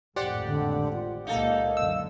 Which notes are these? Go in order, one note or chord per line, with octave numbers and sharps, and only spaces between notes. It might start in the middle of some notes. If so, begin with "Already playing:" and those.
G#1 F2 A2 G4 C5 D5 F#5
D3
F4
C#2 A#2 A#3 D#4 A4 F5
F#1 D3 E6